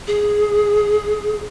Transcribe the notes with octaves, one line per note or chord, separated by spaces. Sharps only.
G#4